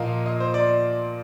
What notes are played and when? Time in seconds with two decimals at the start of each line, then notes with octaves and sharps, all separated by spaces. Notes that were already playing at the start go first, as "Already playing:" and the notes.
Already playing: A#2 F3 A#3 F4 D#5 F5
0.26 D#5
0.40 C5
0.54 D5